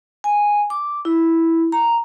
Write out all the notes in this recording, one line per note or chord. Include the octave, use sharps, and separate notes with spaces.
G#5
D6
E4
A#5